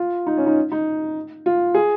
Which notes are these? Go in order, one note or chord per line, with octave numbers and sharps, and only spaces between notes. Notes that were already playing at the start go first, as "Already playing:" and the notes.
Already playing: F4
D#4
C#4
D#4
D#4
F4
G#4